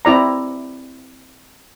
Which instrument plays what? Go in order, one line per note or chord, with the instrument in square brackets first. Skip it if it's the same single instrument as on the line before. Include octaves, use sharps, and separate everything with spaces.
[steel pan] C4 E4 D5 A#5